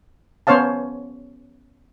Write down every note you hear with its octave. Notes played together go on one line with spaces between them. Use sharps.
B3 C#4 C5 C#5 F5 A5